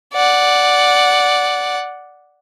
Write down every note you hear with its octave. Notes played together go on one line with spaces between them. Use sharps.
D5 F#5